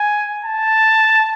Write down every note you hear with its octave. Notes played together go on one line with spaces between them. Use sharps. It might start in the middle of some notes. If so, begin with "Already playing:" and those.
Already playing: G#5
A5